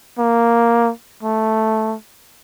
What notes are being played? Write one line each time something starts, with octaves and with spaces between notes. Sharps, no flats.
A#3
A3